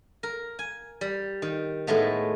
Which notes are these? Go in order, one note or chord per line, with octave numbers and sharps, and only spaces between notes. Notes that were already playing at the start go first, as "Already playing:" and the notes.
A#4
G#5
G3
D#3
A2 D#3 G#3 A3 B3